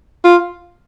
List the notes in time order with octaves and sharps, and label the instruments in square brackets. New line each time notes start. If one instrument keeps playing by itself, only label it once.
[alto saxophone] F4